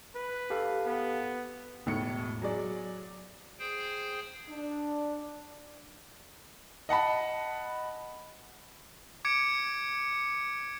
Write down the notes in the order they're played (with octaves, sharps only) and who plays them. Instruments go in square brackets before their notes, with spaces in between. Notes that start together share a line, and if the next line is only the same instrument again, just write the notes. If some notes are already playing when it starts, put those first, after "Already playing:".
[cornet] B4
[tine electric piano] G4 A4 F5
[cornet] B3
[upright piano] E1 A2 B3 C#7
F#3 G#4 D5
[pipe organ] G#4 C5 G5
[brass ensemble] D4
[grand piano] D#5 F#5 A5 B5
[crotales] D6 G#6 C#7 D7